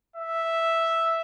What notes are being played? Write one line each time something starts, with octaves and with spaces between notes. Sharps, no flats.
E5